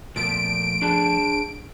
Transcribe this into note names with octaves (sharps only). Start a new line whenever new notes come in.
A#2 F3 A3 B3 D7
D4 G#4 A5